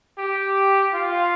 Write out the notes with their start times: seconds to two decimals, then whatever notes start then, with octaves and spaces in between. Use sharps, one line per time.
0.18 G4
0.94 F4